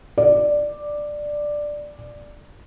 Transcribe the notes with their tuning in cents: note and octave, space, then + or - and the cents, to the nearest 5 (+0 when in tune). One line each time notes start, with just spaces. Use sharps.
D5 +5